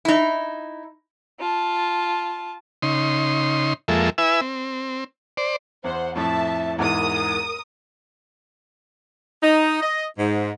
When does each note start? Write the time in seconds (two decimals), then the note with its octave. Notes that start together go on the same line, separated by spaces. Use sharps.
0.05 D#4 E4
1.39 F4 A5
2.83 C#3 D#4 C6
3.88 F2 F3 G#3 A#3 A4 E5
4.18 E4 B4 E5 G#5 E6
4.41 C4
5.37 C5 D5
5.84 E2 C5 F#5
6.16 F2 A2 E5 A5
6.78 E2 G#2 E3 A#4 D#6
9.43 D#4
9.82 D#5
10.18 G#2